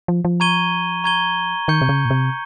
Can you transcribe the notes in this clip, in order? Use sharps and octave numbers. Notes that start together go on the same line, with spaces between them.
F3
F3
A#5 C#6 G#6 D#7 G7
A#5 C#6 G#6 D#7 G7
D#3 C#6 G6 C#7 G7
C3
C#3
A#2
C3